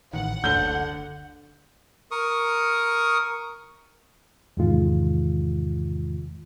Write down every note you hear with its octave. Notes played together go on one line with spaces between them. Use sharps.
A1 D#3 F#5
F#1 D2 D3 G6 G7
A#4 C#6 D#6
E2 G#2 C3 D#3 G#3 F4